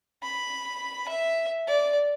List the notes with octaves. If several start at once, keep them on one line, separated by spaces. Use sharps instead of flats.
B5
E5
D5